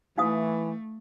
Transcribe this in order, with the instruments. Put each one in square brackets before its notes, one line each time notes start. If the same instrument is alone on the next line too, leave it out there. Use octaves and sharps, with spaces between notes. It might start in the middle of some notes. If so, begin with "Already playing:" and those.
[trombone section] E3 [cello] A3 [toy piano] D#4 F5 D#6